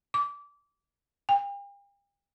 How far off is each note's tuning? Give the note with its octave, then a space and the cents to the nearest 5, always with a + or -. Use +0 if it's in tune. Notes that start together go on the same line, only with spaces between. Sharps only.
D6 -25
G5 +45